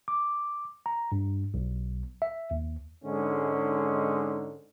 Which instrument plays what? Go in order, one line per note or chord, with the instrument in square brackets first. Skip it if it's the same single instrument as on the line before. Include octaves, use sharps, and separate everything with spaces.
[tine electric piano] D6
A#5
G2
B1
E5
D#2
[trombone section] G#2 D3 G#3 C#4 D#4